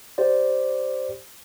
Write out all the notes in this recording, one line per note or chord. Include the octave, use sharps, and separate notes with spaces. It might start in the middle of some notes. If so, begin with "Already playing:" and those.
G4 C5 D5